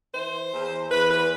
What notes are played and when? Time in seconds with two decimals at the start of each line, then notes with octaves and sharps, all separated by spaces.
0.14 E3 C5
0.53 E2
0.91 E2 B4
1.10 B4